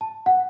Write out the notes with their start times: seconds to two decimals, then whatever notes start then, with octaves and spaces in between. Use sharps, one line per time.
0.01 A5
0.26 F#5